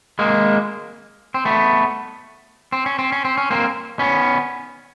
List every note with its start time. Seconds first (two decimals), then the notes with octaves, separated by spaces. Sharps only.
0.19 G#3 A#3
1.34 C4
1.45 A3 B3
2.72 C4
2.86 C#4
2.99 C4
3.12 C#4
3.25 C4
3.38 C#4
3.50 A#3 C4
3.99 B3 C#4